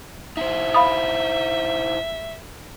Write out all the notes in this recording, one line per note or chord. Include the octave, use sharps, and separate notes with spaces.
D#4 E4 C5 E5
F5 B5 D#6